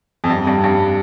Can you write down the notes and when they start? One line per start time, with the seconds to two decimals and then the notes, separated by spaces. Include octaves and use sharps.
0.24 F2
0.30 G2
0.47 G2
0.64 G2